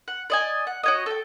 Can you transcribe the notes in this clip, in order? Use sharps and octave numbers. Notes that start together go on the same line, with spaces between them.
F#5
D5 D#5 G#5
F#5
F#4 C#5 D#5
A4 G5